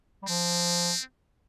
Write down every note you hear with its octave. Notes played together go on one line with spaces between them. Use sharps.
G3
F3 C4